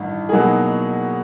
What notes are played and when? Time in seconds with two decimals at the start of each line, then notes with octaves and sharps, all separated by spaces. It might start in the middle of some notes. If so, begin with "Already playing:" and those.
Already playing: A1 G2 D#3
0.29 B2 F#3 A#3 D#4 G#4